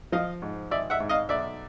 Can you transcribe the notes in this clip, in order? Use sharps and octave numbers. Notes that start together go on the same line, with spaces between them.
F3 D#5 F5
G#2
G#1 D5 E5
E5 F#5
G#2
D#5 F5
B1 D5 E5